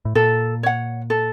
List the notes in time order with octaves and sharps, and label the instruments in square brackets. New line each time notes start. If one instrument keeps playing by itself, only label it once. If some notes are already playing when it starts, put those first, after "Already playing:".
[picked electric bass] A2
[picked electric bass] A#2 [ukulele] A4
[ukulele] C#5 F#5
A4